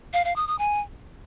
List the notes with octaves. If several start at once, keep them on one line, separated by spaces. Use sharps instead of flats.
F5
F5
D#6
D#6
G#5